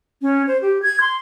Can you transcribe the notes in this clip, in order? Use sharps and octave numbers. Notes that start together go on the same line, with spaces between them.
C#4
C5
G4
G#6
C6